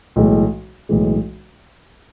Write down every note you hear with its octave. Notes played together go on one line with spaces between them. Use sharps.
B1 A2 E3 G#3
B1 A2 E3 G#3